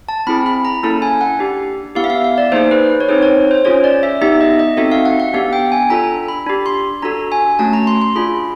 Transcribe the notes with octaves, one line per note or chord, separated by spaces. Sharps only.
A5
C4 E4 G#4 B5
B5
A#5
A#3 C#4 E4 A4 A5
G#5
F#5
D4 G4
B3 E4 G4 F5
E5
F5
F5
D5
A#3 D#4 G#4 C5
B4
B4
C#5
C4 D#4 G#4 C5
C#5
C5
C#4 F4 G#4 C#5
D5
E5
B3 D#4 G4 E5
D#5
D#5
C4 D#4 F#4 A4 E5
F5
F#5
F#5
B3 D4 G4 F5
G5
G#5
D4 F4 A4 A#5
B5
D4 G4
C6
D4 F#4 A4 A#5
G#5
A3 C#4 F#4 A5
A#5
C6
C6
D4 F4 G#4 B5